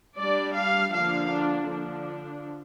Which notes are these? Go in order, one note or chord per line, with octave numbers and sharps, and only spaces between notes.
G3 D4 D5
F5
D3 F3 A#3 D4 F5
D4
D3 F3 D4